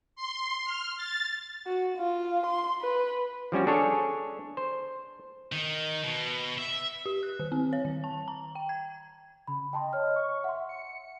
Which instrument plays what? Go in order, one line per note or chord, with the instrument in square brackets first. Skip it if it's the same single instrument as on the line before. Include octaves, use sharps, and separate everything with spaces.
[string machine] C6
F6
A6
[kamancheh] F#4
F4
C6
B4
[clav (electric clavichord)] F3 G3 C#4 F#4
D4 G#4 A4 C#5 G#5
C5
[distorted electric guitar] D#3
B2
E5
[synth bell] G4
F#6
D#3
C4
C#5
D#3
A5
A#5
G5
G#6
[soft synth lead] C#3 [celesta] B5
[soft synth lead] D#5 [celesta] G5 A5 C6
[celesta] C#5 F6
[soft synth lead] C#6
[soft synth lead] E5 [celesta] F#5 C6
[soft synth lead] C#7